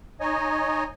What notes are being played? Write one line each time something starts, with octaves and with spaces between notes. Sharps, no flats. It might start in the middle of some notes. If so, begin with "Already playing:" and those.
D#4 C#5 D#5 G#5